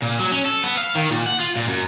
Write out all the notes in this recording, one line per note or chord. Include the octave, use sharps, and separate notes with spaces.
A#2
F#3
C#4
A4
B3
F5
D#3
A#2
F#5
F4
A#2
F#2